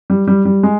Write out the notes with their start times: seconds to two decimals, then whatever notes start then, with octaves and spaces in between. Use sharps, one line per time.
0.10 G3
0.27 G3
0.45 G3
0.63 G#3